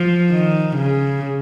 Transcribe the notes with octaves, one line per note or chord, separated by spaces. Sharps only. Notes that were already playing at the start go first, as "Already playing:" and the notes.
Already playing: F3
D#3
C#3